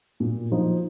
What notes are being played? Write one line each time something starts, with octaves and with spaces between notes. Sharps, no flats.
A#2
F3 D#4